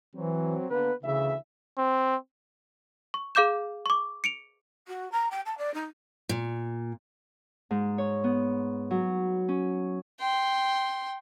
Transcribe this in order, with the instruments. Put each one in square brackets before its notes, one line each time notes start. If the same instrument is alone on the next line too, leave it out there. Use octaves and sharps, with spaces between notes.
[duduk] E3 [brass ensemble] F#3 C4
[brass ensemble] D3 A#3 B3 [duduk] B4
[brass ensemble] D2 E3 E5 [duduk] C#3
[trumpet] C4
[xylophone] C#6
G#4 F5 D6 G6 E7
C#6 D6
C#7 D7 F7
[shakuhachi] F#4
A#5
G5
A5
D5
D#4
[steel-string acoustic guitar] A#2
[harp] G#2
C#5
B3
F#3
C#4
[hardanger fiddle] G5 C6